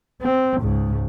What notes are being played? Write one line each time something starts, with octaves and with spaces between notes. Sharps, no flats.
C4
C#2 G#2